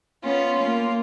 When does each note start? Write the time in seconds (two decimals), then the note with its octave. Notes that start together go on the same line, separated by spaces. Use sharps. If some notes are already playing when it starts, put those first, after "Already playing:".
0.25 B3 C#4 F4
0.60 A#3 F4